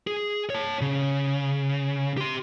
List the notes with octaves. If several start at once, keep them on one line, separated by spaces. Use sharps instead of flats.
G#4
C#5 A5
C#3
G4 C6